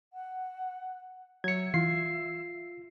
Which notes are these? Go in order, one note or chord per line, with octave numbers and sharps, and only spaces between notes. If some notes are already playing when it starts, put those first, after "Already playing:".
F#5
F#3 E5 G#6 C#7
E3 F4 C7